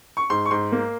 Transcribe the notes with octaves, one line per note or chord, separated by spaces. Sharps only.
C#6
G#2 C6
C#6
G#2 C6
A#3